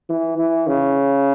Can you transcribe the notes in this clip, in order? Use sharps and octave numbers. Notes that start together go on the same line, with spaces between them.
E3
E3
C#3